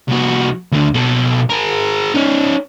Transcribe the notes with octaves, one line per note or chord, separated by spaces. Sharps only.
C2 F#4
D2 D3
B2 A4
G#4 A#4
C#4 D#4